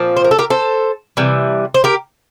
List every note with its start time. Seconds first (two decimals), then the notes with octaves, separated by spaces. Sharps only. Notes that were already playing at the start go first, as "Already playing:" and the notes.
Already playing: A#2 F3 C4
0.17 C5
0.24 A#4
0.31 A4
0.39 G4 A#4
0.50 A4 C5
1.17 C3 E3 G3
1.74 C5
1.84 G4 A#4